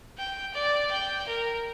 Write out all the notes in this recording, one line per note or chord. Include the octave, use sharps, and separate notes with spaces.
G5
D5
G5
A#4